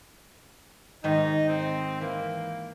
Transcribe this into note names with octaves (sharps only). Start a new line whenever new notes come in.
G#2 D#3 D#4
C4
E3 A#3